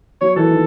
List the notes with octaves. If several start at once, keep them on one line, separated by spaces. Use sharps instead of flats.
F#3 C#5
E3 A4
D#3